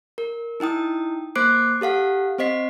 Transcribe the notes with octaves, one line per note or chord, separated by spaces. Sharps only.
A#4
D#4 E4 G5 D#6
A#3 C5 D6 F#6 C7 D7
G4 A4 F5 F#5
C4 C5 D#5 B6 C7